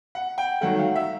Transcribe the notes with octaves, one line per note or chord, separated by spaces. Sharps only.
F#5
G5
D#3 F#3 A3 F#5
F5
E5